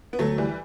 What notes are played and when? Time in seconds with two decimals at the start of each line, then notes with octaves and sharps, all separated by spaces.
0.13 B3
0.19 D2 F#3 A3
0.38 E3 G3